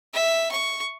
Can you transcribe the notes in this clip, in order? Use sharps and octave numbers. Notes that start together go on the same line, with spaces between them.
E5
C#6